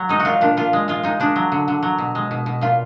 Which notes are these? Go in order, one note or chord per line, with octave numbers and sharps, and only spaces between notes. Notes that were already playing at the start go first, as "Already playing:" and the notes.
Already playing: F#3
G#3 D#4
F#4
A#2 F4
A#2 D4
A#2 F4
G#3
G#3 F4
G#3 D#4
G#3 D4
F#3
D3
D3
F#3
B2
G#3
B2
B2
A#2 F4